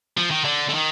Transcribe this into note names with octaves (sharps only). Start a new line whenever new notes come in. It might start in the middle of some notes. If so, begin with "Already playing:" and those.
F3
D#3
D3
D3
D#3